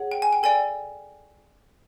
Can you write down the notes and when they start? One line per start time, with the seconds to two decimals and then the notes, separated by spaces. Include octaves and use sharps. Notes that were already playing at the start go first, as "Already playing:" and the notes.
Already playing: G#4 C#5 F#5
0.12 G5
0.22 G#5
0.33 G5
0.43 A4 D5 G5 G#5